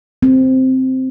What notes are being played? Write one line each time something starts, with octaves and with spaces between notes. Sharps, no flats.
C4